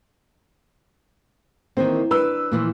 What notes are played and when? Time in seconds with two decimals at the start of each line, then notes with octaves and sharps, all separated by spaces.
1.77 D#3 E3 A#3 C4
2.11 D4 B4 E6
2.52 A#2 E3 F3